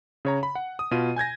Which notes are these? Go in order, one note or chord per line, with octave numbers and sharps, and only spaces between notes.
C#3 C#5 A#5
B5
F#5
D#6
B2 F4 D#7
G#5 G6 G#6 A#6